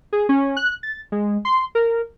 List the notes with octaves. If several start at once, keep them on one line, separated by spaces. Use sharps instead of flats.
G#4
C#4
F#6
A6
G#3
C6
A#4